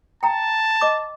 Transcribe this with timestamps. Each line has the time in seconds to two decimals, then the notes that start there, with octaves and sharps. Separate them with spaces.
0.23 G5 A5 A#5
0.81 D#5 D6